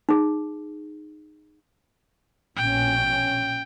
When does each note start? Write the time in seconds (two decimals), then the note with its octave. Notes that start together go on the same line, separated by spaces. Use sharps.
0.09 D#4 G#4
2.56 A#1 B2 C#4 G5